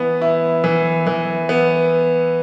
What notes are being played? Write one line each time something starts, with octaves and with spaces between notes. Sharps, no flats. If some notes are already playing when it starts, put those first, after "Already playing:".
Already playing: E3 B3
E4
E3
E3
B3